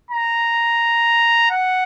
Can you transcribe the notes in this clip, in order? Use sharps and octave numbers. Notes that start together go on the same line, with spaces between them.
A#5
F#5